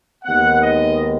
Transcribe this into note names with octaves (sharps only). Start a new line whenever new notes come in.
D#2 D#3 G#3 B3 F#5
D#5